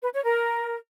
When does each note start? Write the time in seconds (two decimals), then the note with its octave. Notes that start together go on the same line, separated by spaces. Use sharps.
0.02 B4
0.13 C#5
0.24 A#4